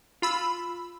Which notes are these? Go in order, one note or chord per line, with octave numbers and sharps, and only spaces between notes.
F4 B5 E6